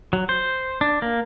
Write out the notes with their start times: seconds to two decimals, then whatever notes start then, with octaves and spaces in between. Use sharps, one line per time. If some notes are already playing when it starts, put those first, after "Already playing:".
0.13 F#3
0.29 C5
0.81 D4
1.02 A#3